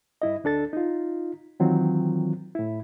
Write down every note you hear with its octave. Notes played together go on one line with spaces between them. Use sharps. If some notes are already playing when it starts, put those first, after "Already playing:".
G2 E4 D#5
D2 D4 A4 A6
D#4 F4
D#3 E3 F#3 C4 F4
A2 E4